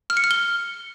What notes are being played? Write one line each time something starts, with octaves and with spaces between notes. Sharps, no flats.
F6
C#7
F6
G7